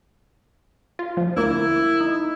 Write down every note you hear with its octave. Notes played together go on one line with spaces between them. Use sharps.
F4
F3
D2 A#3 E4
D#4